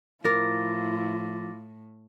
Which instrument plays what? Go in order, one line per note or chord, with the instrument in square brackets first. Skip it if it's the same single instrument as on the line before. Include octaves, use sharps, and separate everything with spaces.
[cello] A2 [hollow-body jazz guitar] F3 A#4 [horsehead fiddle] E4 F4 [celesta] D6 A6 A#6